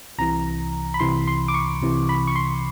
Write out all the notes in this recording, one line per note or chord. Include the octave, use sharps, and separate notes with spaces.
C2 C3 E3 A#5
B5
C2 C3 E3 C6
C6
D6
C#6
C2 C3 E3
B5
C#6
C6